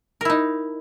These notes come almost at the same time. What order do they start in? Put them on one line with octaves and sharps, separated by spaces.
A#4 E4 D#4